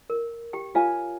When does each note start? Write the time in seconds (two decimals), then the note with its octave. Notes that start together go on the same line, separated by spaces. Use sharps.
0.10 A#4
0.53 G4 G5
0.75 F4 A#4 C#5 F5 G#5